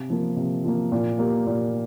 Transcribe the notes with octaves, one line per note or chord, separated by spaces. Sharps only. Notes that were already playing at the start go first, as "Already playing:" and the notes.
Already playing: C3
F3 A#3
C3
F3 A#3
A#2
A#3 G4
A#2